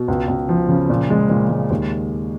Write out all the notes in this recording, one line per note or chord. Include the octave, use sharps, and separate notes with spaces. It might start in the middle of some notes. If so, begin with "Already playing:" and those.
Already playing: B2
C#2
C#2
F3
C#3
A#2
G#3
A#2
G#3
D#2